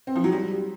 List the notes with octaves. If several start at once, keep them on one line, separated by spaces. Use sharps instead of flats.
C4
F3
F#3
G3